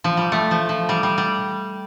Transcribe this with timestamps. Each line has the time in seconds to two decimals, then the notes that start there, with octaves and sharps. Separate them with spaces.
0.04 F3
0.17 G3
0.32 A3
0.51 F3
0.69 F3
0.89 G3
1.03 G3
1.18 G3